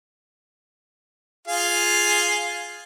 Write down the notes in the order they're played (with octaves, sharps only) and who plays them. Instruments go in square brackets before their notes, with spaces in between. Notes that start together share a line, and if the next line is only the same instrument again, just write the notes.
[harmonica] F4 G#4 F5